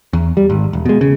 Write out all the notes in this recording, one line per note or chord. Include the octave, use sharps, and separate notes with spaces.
E2
G3
G#1
E1
B2 G#3
C#3